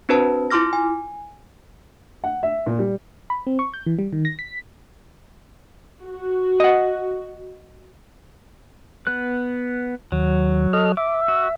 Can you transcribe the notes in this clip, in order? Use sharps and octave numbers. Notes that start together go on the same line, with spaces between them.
C4 D4 F#4 B4 C5 A5
E4 F4 C6 D6 F6 A#6
G#5
F#5
E5
A#2
G3
B5
C4
C#6
G6
E3
G3
D#3
A#6
B6
F#4
D#5 F#5
B3 B4 F#6
D#2 F#3
A4 D#5 F6
E5 D6
F#4